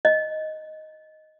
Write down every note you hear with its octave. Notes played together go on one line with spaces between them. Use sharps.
D#5